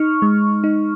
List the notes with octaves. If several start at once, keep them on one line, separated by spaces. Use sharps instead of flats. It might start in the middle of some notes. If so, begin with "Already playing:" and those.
Already playing: D#4 C#6 F6
G#3
D#4